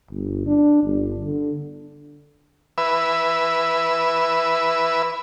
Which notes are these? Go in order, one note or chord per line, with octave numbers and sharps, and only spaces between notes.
G1
D4
G1
D3
B4 E5